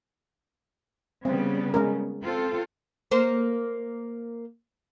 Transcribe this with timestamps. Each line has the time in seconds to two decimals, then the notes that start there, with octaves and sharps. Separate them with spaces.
1.25 C#3 G3 B3 C4
1.74 G#3 C#4 A#4
2.22 C4 F4 A4
3.11 A#3 C5